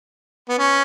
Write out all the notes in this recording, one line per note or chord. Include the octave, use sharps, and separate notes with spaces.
B3
C#4